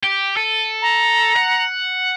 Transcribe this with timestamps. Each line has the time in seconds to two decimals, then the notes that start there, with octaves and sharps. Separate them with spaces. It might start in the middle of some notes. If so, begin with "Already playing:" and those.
0.04 G4
0.37 A4 D#7
0.82 A#5
1.36 F#5